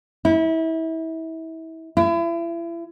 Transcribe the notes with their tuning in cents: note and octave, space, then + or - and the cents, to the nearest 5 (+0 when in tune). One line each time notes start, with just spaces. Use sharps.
E4 -30
E4 +35